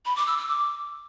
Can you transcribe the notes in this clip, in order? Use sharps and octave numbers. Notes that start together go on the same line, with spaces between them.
B5
D6
E6
E6
D6